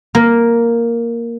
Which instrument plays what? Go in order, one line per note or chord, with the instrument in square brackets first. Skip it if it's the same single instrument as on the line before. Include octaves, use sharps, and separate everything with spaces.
[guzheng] A#3